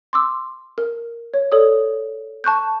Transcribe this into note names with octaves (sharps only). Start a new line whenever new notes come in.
C6 D6 E6
A#4
C#5
A4 C#5 D5 D#6
A5 C#6 F#6 G6